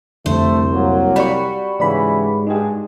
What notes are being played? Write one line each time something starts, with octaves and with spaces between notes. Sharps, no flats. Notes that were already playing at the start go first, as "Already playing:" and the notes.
C2 F2 D3 A3 C5
F#3 A#3
G3 F#4 B5 C#6
G#2 C#3 E3 D5 B5
G2 G#3 D#4 G4 G#4